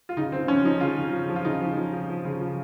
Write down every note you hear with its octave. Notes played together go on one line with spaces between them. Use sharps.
F4
C#3 D#4
C#3 C4
F3 C#4
F3 D#4
C#3 F4
C#3
F3
F3
F4
C#3 D#4
F3
F3
F3
F3
C#3
F3